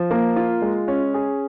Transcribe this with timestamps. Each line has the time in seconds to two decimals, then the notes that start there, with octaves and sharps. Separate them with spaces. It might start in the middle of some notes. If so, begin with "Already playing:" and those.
Already playing: F3
0.11 A#3
0.36 F4
0.62 G#3
0.88 C#4
1.14 G#4